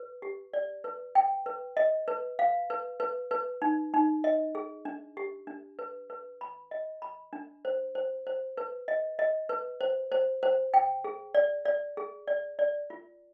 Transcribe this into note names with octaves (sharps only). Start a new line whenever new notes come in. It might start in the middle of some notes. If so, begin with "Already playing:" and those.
Already playing: B4
G4
D5
B4
G5
B4
D#5
B4
F5
B4
B4
B4
D#4
D#4
D#5
G#4
D4
G4
D4
B4
B4
B5
D#5
B5
D4
C5
C5
C5
B4
D#5
D#5
B4
C5
C5
C5
G5
G#4
D5
D5
G#4
D5
D5
F4